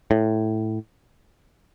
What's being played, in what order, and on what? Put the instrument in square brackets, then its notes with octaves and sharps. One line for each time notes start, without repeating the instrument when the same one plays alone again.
[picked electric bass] A2